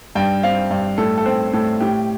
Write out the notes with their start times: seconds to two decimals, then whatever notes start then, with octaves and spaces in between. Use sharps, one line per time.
0.15 G2 G5
0.43 C4 F5
0.71 G2
0.98 A2 A4
1.18 A4
1.26 C4 C5
1.53 A2 A4
1.81 A2 G4